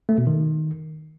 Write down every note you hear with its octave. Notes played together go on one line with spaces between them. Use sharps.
A3
B2
D#3